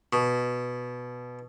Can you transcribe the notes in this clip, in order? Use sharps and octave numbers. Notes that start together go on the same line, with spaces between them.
B2